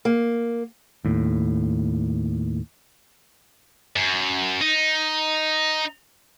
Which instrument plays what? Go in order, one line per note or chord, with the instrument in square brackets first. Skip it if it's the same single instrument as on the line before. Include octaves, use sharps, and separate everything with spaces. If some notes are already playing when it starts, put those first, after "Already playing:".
[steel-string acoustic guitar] A#3
[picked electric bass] D#2 A2
[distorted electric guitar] F#2
D#4